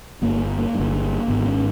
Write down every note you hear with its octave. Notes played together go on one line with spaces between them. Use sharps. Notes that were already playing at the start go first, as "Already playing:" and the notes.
G1 G2 A#3
A#3
G1 G2
G#1 G#2 B3
C#4